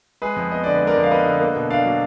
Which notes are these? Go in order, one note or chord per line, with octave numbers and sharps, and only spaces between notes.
G#3 G#4 B4
F2
B3 D#5
D3 D5
B4
G#3
A#4 D5
F2
F5
B3 B4 D#5
D3
A#3
B2
D4 D5 F5
F#3